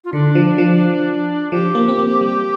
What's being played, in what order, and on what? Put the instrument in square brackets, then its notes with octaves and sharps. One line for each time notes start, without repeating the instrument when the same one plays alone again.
[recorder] F4
[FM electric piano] D3 [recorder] D4
[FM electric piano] F3
F3
[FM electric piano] F3 [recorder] G4
[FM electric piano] A#3
C4
A#3
G3